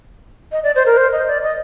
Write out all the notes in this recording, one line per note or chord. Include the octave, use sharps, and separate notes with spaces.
D#5
D5
C5
A#4
C5
D#5
D5
D#5